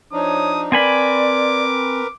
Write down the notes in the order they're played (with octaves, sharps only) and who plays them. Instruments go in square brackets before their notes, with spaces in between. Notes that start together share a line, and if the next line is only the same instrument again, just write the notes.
[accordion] F3 D4 D#4 [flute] C#5 [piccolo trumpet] D#6
[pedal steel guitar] C4 G#5 B5 [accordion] A#4 B4 [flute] D5 [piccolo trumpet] D6